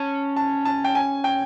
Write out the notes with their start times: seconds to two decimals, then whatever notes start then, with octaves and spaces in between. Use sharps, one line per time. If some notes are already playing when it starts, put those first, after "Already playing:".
Already playing: C#4 A5
0.36 A5
0.65 A5
0.84 G5
0.95 G#5
1.24 G5